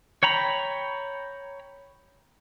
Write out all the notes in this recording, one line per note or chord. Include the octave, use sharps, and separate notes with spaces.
C#5 G5 A#5 B5